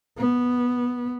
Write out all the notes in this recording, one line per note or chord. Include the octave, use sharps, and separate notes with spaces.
B3